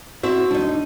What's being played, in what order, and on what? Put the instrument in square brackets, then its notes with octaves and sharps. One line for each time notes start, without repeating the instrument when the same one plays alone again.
[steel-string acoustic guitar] C4 E4 E5 [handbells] F#4
[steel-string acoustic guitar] D2 D#4 [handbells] D4